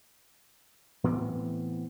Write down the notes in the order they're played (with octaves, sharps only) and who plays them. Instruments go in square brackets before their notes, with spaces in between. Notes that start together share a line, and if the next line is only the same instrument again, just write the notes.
[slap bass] A2 E3 B3 C4